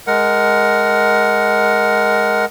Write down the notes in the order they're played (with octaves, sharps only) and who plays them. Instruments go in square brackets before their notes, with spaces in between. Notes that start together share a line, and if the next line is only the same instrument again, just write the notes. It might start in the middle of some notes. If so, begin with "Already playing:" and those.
[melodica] G#3 A#4 F#5